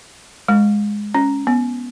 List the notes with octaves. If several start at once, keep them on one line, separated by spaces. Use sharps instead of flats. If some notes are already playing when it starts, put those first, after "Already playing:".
G#3
C#4
B3